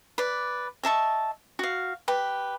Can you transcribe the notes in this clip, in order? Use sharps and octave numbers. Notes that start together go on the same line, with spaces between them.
B4 D5
D#5 E5 A5 C#6
F#4 F5
G4 B4